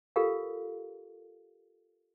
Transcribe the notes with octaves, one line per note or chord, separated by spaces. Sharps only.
F4 G4 A4 A#4 F5